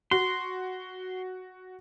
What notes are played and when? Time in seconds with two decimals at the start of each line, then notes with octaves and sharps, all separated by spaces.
0.11 F#4 C6